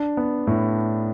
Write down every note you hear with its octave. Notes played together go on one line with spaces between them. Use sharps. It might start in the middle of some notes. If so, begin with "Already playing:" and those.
Already playing: D4
B3
A2